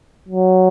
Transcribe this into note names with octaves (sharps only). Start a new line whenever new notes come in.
F#3